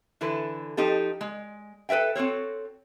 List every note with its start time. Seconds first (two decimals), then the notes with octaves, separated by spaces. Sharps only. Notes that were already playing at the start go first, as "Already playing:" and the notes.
0.21 D3 E3 E4 A4 B4
0.77 F3 D#4 G4 A4
1.21 G#3
1.89 A4 B4 D5 E5 G5
2.15 C4 F#4 A4 C#5